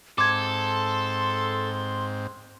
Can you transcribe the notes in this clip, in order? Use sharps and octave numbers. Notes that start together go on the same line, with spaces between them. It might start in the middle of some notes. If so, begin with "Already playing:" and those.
G#2 C4 A4 C6 D6 G#6